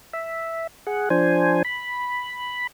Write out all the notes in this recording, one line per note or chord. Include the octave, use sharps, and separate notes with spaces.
E5
G#4 F#5
F3 D4 C5 G#5
B5